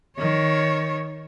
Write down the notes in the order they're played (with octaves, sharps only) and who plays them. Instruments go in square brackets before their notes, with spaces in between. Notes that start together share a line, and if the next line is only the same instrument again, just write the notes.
[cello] D#3 C#5